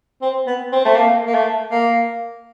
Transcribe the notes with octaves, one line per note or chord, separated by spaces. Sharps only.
C4
B3
C4
A3
A#3
A#3
A3
A#3